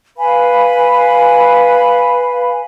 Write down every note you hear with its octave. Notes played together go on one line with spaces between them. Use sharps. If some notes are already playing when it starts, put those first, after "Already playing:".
B4 F5 G#5 B5